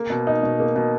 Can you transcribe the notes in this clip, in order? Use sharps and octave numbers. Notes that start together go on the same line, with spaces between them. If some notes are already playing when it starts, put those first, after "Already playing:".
Already playing: A#3
B2
D#4
B2
A#3
B2